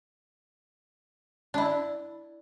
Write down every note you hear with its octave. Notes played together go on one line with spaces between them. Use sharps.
D4 E4